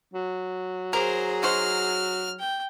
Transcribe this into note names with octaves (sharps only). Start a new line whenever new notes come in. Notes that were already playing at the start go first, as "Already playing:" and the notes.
F#3
G#4 A#4 C5 A#5
D#4 F#4 C5 F6
G5